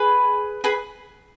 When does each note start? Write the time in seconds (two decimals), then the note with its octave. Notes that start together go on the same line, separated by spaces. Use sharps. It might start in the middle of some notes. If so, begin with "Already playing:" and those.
Already playing: G#4 B4
0.64 G#4 B4